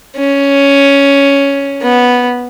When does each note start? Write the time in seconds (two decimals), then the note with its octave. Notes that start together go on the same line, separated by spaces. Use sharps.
0.16 C#4
1.82 B3